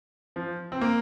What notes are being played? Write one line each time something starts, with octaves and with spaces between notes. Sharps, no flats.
F3
C4
A#3